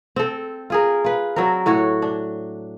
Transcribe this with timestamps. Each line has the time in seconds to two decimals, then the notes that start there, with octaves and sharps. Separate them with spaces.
0.16 C4 A4
0.70 F4 G#4 A#4
1.05 F4 B4
1.36 F#3 C4 D4 A#4
1.66 A2 F#4 C#5
2.02 D4